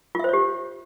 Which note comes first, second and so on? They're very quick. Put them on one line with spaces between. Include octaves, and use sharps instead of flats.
F4 E5 C5 C#5 G4